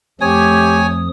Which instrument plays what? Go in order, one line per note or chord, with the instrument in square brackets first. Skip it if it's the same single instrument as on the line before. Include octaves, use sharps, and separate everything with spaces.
[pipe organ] F2 F3 D#6 [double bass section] A3 [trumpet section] G4 [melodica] C#5 G#5